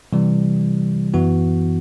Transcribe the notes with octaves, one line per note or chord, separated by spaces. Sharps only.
C3 E3 G3
F#2 E3 B3 F#4